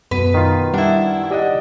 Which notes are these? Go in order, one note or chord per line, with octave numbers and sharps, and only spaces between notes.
F#2 B2 B4
D#3 F4
G3 D4 E4 F#5
G4 D5 D#5 F#5